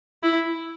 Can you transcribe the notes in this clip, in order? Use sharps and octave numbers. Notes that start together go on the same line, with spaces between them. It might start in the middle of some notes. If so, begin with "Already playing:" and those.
E4